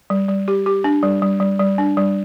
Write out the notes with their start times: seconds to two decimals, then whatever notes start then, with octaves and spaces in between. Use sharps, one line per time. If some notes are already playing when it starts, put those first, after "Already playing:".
0.10 G3
0.28 G3
0.48 G4
0.66 G4
0.84 D4
1.03 G3
1.22 G3
1.40 G3
1.59 G3
1.78 D4
1.97 G3